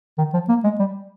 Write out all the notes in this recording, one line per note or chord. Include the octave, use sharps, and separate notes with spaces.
D#3
F3
A#3
G#3
G3